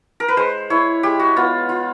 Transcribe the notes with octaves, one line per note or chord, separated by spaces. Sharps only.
A#4
B4
G#3 C5
E4 C#5
G#3 G4
F#4
B3 F4
F4